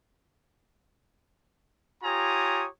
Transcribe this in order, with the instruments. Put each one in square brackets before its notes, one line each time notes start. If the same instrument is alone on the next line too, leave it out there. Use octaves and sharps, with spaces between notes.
[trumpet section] F4 G4 C#5 G#5 A#5 D#6